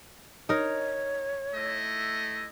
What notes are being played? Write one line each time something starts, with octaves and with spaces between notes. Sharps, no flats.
D#4 A#4 C#5
A3 E4 D#5